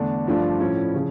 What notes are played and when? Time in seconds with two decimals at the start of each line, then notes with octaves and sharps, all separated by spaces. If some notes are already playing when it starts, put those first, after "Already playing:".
Already playing: E2 D3 A3 D4
0.27 G2 F3 A3 D4 F4
0.60 A2 F3 C#4 E4
0.94 C#3 F3